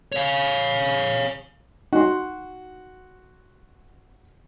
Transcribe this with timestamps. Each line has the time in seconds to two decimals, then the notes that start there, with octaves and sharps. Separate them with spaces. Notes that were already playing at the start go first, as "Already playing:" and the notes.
0.12 C#5 F5
1.93 D#4 F#4 C6